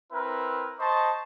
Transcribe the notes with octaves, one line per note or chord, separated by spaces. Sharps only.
C4 E4 A#4 B4
C5 D#5 A5 B5 C#6